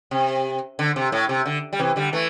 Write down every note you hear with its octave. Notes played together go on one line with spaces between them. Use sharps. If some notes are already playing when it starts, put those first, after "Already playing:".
C3
D3
C3
A2
C3
D3
G3
C3 E3
D3 G3
E3 A3